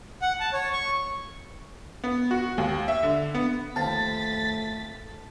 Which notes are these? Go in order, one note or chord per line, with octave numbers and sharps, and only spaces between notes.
F#5
A5
C#5
C#6
B3
F#4
D#2
E5
D3
B3
D#2 F3 A3 C4 A5 A6 B6